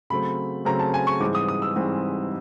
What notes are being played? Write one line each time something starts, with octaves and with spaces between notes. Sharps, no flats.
C#3 F#3 A3 C4 B5
C#3 F#3 A3 C4 A#5
A5
G#5
C#6
G#2 E3 G3 C4 D6
D#6
D#6
E6
G#2 E3 G3 C4